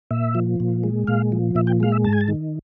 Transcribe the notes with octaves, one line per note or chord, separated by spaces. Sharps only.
A#2 E5
F3
A#2
G#3
A#2 F5
F3
A#2 E5
G5
G#3 F5
E5
G#2 A5
G#5
A5
D#3